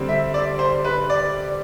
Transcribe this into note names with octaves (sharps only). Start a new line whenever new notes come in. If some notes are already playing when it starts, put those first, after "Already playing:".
Already playing: D3 G3 C4
E5
D5
C5
B4
D5